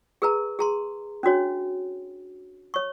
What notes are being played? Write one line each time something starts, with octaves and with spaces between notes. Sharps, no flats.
G#4 A#4 B4 A#5
G#4 A#5 C6
C#4 D4 F#4 C#5
C#5 C#6